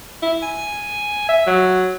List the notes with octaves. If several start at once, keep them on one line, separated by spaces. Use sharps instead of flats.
E4
G#5
E5
F#3